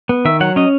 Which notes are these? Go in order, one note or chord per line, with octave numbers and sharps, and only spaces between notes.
B3
D#3 E5
F#3 F#5
C#4 D#5